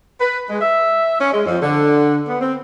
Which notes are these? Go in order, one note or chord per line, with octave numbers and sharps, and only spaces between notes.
B4
G#3
E5
C#4
G#3
F2
D3
B3
C4